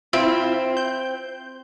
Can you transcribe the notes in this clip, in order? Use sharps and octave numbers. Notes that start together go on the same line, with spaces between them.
C4 E4 F4 E5
G6